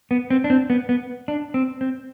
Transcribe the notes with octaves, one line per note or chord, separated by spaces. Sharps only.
B3
C4
D4
C4
B3
B3
D4
C4
C4